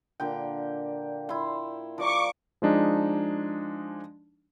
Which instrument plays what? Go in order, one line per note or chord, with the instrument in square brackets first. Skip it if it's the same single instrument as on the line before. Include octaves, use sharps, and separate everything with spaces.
[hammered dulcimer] A#2 D3 G5
E4 C6
[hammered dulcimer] F3 D5 A#5 [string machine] C#6 D6
[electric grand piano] F3 G#3 D4 D#4